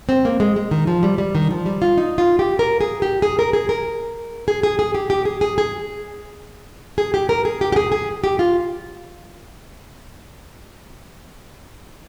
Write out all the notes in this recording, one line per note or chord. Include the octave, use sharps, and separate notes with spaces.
C4
A#3
G#3
G#3
D#3
F3
G3
G3
D#3
F3
G3
F4
D#4
F4
G4
A#4
G#4
G4
G#4
A#4
G#4
A#4
G#4
G#4
G#4
G4
G4
G#4
G#4
G#4
G#4
G4
A#4
G#4
G4
G4
G#4
G#4
G4
F4